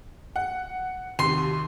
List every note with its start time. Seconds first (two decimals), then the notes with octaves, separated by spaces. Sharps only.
0.36 F#5
1.19 D#2 C3 C6